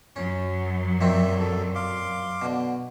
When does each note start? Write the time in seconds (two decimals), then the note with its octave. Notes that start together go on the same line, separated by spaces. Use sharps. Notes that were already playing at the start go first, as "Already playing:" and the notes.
0.16 F#2 F#3 C#4
1.01 A#2 D#3 C4 E5
1.39 A4
1.75 F5 C6 D6
2.42 B2 D3